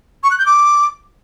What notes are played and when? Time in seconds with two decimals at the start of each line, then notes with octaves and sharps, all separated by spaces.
0.23 C#6
0.31 F#6
0.38 G6
0.46 D6